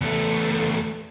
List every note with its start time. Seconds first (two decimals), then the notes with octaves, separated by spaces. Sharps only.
0.01 E2 A3